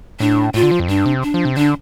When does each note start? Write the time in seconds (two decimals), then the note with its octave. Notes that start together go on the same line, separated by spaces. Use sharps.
0.20 A2 D4
0.54 A2 F4
0.63 D3
0.71 F3
0.80 F2
0.88 G2 D4
1.06 C3
1.23 D4
1.34 F3
1.45 C3
1.57 D3 D4